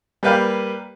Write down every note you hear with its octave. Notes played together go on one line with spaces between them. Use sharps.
G3 A#3 B4 F5 G5